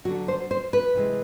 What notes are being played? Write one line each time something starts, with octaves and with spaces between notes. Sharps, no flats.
D3 F#3 F#4
C5
C5
B4
C3 E3 G#3